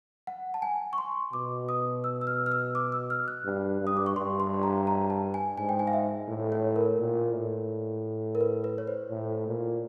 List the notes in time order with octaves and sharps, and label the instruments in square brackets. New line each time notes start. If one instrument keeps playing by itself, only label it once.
[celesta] F#5
A5
G#5
C#6
C6
[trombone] B2 [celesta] D6
[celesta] D#6
E6
E6
F6
F6
E6
D6
E6
F6
F#6
[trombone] G2
G2
[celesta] D#6
D6
C#6
[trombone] G2 [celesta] C6
[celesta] C6
A#5
A#5
A5
G#5
[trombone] G#2 [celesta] G#5
[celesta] G5
G#5
F5
E5
[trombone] A2
[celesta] C#5
A#4
[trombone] A#2
A2
[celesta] A#4
B4
B4
C#5
C5
[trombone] A2
A#2